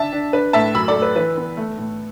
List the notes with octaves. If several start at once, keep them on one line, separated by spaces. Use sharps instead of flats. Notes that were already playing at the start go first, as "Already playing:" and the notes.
Already playing: D4 E5 A5
D4
D4 B4
A2 E5 A5
F#2 B5 E6
A4 D5
A3
B4
E3 B4
B3
A3
A2